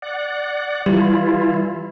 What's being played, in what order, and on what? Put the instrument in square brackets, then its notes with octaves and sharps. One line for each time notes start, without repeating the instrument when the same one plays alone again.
[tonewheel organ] D5 F#5
[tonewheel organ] E3 E4 F4 [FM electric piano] G3